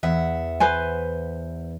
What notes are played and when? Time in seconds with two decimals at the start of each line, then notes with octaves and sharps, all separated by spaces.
0.03 E2 E5 F#5
0.60 B4 C5 G#5